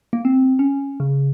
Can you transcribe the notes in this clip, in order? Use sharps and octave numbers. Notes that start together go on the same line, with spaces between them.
A#3
C4
C#4
C#3